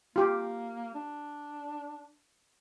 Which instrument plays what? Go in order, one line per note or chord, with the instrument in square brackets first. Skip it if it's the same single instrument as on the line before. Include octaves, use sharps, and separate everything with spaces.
[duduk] A#3 [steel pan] F4 G4
[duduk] D4